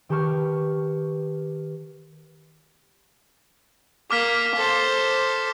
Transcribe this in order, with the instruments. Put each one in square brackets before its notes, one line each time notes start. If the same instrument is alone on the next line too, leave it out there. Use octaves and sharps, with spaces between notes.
[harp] D#3 G4 B4 A5 C#6 F6
[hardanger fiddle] A#3 [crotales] D6 F6 B6
[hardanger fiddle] A4 C5